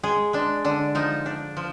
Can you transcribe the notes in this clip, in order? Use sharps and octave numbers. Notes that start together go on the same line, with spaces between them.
G#3 G#4
G#3 D4
D3 D4
F3 D#4
D4
F3